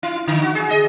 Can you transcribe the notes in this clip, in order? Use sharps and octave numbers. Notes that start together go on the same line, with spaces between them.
E4
D3
F#4
G#4
D#5